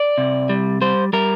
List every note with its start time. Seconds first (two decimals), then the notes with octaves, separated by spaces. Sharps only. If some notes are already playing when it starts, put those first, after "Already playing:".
Already playing: D5
0.18 C3
0.49 G3
0.81 G3 C5
1.13 G3 A#4